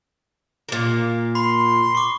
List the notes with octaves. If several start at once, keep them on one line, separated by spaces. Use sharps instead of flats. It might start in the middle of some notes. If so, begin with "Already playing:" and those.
A#2 A#3
B5 C6
C#6 D6